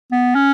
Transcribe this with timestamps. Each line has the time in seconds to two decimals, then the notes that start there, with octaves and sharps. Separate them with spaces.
0.12 B3
0.35 C#4